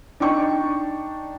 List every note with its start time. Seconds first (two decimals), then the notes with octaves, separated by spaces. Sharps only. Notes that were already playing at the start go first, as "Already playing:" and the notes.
0.20 D4 D#4 G5 C#6